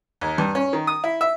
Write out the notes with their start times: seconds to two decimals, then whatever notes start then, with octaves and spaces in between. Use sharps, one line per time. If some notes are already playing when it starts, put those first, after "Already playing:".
0.21 D#2
0.38 G2
0.55 C#4
0.73 D#3
0.87 D#6
1.04 E4
1.21 E5